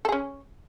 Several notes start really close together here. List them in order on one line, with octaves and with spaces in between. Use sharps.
A4 G#4 C#4